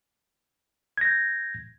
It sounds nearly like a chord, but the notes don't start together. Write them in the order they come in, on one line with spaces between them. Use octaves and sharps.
G#6 A#6 G6